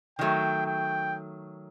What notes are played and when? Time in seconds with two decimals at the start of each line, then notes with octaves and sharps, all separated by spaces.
0.19 D#3 F#3 A3 G5
0.66 G5